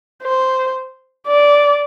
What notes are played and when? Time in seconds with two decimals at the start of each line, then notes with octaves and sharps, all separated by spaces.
0.23 C5
1.27 D5